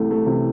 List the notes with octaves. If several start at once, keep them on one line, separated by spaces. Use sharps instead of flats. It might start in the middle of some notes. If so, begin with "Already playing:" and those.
Already playing: C2 C3 E3 A3
A3
C3 E3